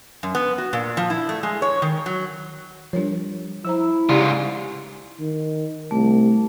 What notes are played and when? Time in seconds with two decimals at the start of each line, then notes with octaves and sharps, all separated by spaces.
0.23 F#2
0.35 B3
0.58 F#4
0.73 A#2
0.97 F3
1.10 E4
1.29 A3
1.43 G#3
1.62 C#5
1.82 D#3
2.06 F#3
2.93 F3 G3 D4 A#4 C#5
3.65 F3 E4 C5 A#5 E6
4.09 G#2 C#3 F4 G4 D5
5.20 D#3
5.91 C2 A3